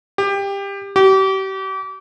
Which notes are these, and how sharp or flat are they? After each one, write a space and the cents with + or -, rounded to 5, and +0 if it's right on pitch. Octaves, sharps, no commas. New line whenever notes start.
G4 +20
G4 -35